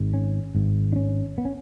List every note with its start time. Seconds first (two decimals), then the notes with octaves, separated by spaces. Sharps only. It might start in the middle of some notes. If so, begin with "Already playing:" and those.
Already playing: G#1 G#2
0.14 C#4
0.55 G#1 G#2
0.93 D4
0.96 C#4
1.38 B3
1.45 C#4